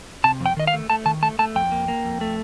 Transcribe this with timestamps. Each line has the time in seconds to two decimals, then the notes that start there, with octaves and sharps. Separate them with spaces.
0.24 C3 A5
0.40 F2
0.46 G5
0.57 D#3 D#5
0.67 F5
0.73 A3
0.90 A3 A5
1.06 D#3 A5
1.23 A3 A5
1.39 A3 A5
1.55 F2 G5
1.72 A#3
1.88 A#3
2.05 F2
2.21 A3